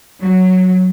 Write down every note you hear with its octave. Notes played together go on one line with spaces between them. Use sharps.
F#3